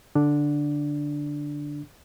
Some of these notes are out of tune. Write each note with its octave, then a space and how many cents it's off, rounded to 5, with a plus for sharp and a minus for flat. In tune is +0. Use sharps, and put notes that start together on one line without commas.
D3 +0 D4 +0